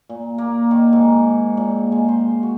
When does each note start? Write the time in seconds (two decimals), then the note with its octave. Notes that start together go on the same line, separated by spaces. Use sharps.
0.09 A#2
0.38 A#3
0.71 D#3
0.93 G#2
1.57 A#2
1.92 G#3
2.08 C5
2.43 F#4